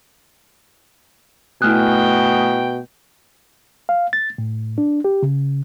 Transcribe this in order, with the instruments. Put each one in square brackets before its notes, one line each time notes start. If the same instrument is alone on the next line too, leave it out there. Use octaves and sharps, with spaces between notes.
[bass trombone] B2 [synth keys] A3 G#5 D#6 [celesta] E4 F6 F#6 [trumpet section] G5
[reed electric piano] F5
A6
A2
D4
G4
C#3